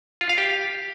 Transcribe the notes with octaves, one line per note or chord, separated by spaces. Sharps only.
F4
F5
G4